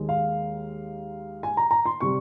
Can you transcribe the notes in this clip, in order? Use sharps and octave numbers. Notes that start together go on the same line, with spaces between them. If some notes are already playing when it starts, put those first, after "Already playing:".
Already playing: D#2 D#3 G#3
F5
G#5
A#5
A#5
C6
C3 G3 C#6